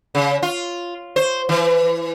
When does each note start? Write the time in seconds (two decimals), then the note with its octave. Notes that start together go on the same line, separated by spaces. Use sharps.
0.15 C#3
0.43 F4
1.16 C5
1.49 E3